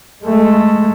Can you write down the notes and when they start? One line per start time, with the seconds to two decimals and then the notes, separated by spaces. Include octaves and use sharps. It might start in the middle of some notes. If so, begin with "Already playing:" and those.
0.25 G#3 A3